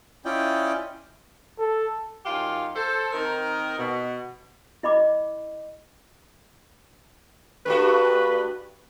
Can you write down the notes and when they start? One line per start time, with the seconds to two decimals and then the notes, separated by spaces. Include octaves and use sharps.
0.25 C#4 E4 F4 D5 D#5 G5
1.59 A4
2.25 F#2 D#4 F4 G4 F5
2.76 A4 C5
3.13 D#3 C4 D#4 A#4
3.78 B2
4.83 E4 D#5 B5 D6
7.66 G2 A3 F#4 B4